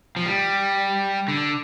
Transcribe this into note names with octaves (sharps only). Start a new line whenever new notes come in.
F3
G3
D3